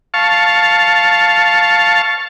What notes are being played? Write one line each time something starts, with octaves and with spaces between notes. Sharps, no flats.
F5 A5 C#6